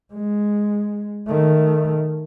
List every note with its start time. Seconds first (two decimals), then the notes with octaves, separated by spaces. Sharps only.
0.14 G#3
1.28 D#3 A3